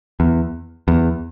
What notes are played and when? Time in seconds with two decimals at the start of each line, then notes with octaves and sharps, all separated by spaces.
0.20 E2
0.88 E2